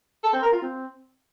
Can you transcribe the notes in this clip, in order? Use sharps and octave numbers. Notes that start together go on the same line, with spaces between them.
A4
C4
A#4
F4
C4